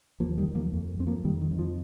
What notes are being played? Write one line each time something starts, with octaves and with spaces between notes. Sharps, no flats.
D#2 F3 A#3
D#3 G3
D#2
F3 A#3
F2
F2 C4
F3 A#3
F2 D#3 G3
D#3
F2
F3